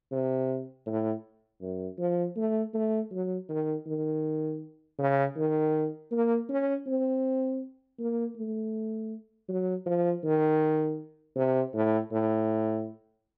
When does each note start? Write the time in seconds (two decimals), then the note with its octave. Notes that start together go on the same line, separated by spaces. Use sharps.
0.12 C3
0.86 A2
1.62 F#2
1.99 F3
2.36 A3
2.74 A3
3.11 F#3
3.49 D#3
3.86 D#3
4.99 C#3
5.37 D#3
6.11 A#3
6.49 C#4
6.87 C4
7.99 A#3
8.36 A3
9.49 F#3
9.86 F3
10.23 D#3
11.36 C3
11.74 A2
12.11 A2